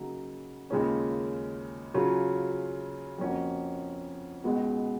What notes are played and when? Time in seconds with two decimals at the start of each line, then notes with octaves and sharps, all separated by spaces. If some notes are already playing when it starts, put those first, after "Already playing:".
Already playing: C#3 F#3 A#3 D#4 F#4
0.70 D#2 C#3 G#3 C#4 F4
1.94 C#3 F#3 C#4 F4
3.18 F2 F3 A#3 C#4 F#4
4.44 C#2 B2 G#3 B3 F#4